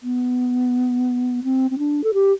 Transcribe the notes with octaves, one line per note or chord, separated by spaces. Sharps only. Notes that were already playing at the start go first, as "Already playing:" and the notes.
B3
C4
C4
D4
A4
G4